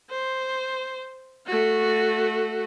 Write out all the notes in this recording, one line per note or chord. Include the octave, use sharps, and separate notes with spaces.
C5
A3 F#4